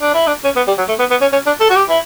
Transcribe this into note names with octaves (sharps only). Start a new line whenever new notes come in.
D4
E4
D4
C#4
B3
G3
F#3
A3
B3
B3
C#4
C#4
D4
A4
F#4
G4
E4